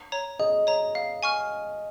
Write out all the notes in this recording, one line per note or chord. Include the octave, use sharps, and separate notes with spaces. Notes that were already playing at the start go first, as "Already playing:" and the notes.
C#5 A#5
G#4 D#5
C#5 A#5
F5
G#5 C#6 F6